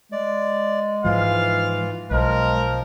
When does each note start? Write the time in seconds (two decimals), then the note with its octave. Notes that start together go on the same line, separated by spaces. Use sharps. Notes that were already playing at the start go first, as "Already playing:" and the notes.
0.12 G#3 D5
1.04 G#2 E3 F3 F4 F5
2.11 B1 F3 G#3 A#4